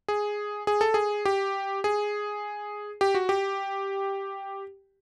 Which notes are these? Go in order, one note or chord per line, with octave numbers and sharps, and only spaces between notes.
G#4
G#4
A4
G#4
G4
G#4
G4
F#4
G4